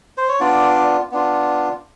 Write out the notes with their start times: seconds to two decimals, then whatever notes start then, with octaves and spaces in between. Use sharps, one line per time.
0.17 C5
0.29 C#5
0.40 B3 D4 F4 D5
1.12 B3 D4 F4